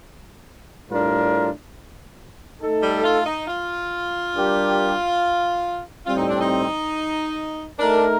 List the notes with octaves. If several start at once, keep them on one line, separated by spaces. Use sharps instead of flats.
A2 G3 D4 F4 A#4
A3 D#4 A4
G3
F4
D#4
F4
G3 D4 G4 A#4
A2 G3 C4 F4
D#4
D4
D#4
A3 D4 D#4 A#4